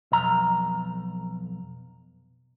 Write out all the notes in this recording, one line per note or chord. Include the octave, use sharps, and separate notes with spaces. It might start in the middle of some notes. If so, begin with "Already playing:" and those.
B1 F2 A#5